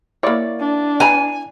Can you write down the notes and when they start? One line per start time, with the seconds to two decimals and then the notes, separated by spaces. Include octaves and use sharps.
0.23 A#3 E4 C#5 D5 A6
0.60 D4
1.00 B4 G#5 A#5 B5